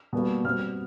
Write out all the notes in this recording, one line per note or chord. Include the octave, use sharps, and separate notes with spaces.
B2 G3 A#3
B2 G3 C4 F6